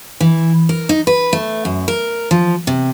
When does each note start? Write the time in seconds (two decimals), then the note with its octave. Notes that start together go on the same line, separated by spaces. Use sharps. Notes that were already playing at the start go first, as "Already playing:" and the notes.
0.20 E3
0.69 A#4
0.89 D#4
1.07 B4
1.33 A3
1.65 F#2
1.88 A#4
2.31 F3
2.67 C3